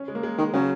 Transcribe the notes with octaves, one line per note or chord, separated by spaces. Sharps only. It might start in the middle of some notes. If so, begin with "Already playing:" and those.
Already playing: C#4
G#3
A#3
G#3
D#3 G#3
C#3 F#3